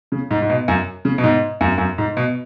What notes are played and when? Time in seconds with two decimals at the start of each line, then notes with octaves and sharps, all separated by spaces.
0.12 C#3
0.31 G#2
0.42 G#2
0.50 B2
0.68 F#2
1.05 C#3
1.18 B2
1.24 G#2
1.61 F#2
1.78 F#2
1.98 G#2
2.17 B2